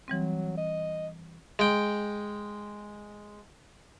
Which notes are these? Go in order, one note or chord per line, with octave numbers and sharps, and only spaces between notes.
E3 F#3 G3 C4
D#5
G#3 G5